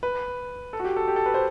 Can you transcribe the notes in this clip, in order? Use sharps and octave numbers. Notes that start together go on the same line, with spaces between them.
B4
A4
F#4
G4
A4
G4
A4
B4
C5